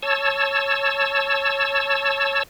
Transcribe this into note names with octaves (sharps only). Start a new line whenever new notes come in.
C#5 A5 E6